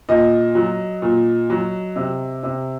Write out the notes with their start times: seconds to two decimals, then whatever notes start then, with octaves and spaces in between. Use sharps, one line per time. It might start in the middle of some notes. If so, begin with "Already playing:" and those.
0.09 A#2 D#5
0.55 F#3
1.02 A#2
1.50 F#3
1.96 C3
2.43 C3